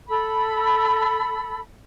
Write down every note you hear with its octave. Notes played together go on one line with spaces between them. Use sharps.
A4 B5